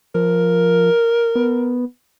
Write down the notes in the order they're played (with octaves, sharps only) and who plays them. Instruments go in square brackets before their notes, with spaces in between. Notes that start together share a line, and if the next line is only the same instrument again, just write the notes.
[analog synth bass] F3 [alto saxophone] A#4
[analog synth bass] B3